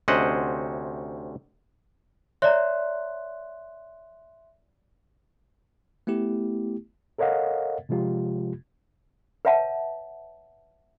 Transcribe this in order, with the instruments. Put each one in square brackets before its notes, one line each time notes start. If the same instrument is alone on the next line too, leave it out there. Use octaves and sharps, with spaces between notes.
[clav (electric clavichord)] D2 C3 C#4 C5 D#5 F#5
[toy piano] C#5 D5 A#5 [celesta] E5 C6 F#6
[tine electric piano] A3 B3 E4 G4
[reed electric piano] A4 A#4 C#5 D#5 F5 F#5
C3 F3 G#3 F4 G4
[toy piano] B4 C#5 E5 F#5 A5